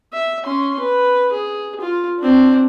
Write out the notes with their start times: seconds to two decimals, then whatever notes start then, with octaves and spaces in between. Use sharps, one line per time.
0.13 E5
0.44 C#4 C6
0.80 B4
1.32 G#4
1.81 F4
2.19 C4 D4